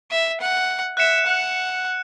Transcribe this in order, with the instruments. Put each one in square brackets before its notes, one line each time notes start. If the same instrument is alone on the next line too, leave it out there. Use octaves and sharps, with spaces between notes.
[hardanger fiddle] E5
F#5
[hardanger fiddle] E5 [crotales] F#6 C#7 E7
[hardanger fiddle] F#5